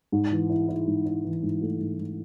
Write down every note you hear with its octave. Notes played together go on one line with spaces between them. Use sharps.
G#2
E3
E4
E4
G#2
E4
E3
G#2
A3
G#2
G#2